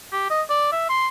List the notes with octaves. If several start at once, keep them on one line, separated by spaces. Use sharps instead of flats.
G4
D#5
D5
E5
C6